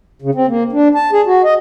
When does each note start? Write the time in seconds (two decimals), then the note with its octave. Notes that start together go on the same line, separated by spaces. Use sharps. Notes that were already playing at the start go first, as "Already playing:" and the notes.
0.22 C#3
0.35 C4
0.48 A#3
0.72 D4
0.95 A5
1.12 G#4
1.26 F#4
1.44 D#5